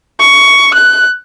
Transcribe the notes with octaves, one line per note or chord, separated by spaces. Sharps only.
C#6
F#6